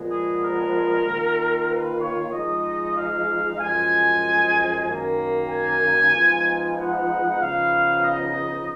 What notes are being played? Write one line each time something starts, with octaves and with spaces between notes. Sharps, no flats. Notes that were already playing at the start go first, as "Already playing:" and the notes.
Already playing: A#2 F3 G#3 B3
G#4
A#4
D#3 A#3 F4
B4
C#5
F3 G#3 D#4 D#5
F5
F#2 F3 G#3 G#5
F#2 D#3 A#3
G#5
F3 G#3 B3 D#4
F#5
C#3 F3 B3 D#4 F5
D#5